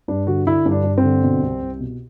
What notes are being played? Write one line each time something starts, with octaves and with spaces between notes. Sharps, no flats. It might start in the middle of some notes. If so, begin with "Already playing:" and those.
G2 D4
D3 F#4
D3 E4
G2
D4
G2
C4
D3
B2
C2
C2
B2